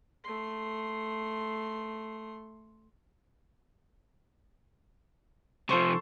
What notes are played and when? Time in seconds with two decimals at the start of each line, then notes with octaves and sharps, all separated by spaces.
0.25 A3 C6
5.69 C3 F3 A4 C5 C#6